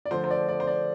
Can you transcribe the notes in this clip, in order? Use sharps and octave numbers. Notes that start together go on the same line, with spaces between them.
D5
D3 F3 A3 C5
C5
D5
D5
C5
D5